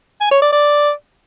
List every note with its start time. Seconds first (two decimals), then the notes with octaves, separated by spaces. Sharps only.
0.21 G#5
0.31 C#5
0.42 D5
0.53 D5